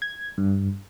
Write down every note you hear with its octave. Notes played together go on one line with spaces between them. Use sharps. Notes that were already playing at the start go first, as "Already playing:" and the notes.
G#6
G2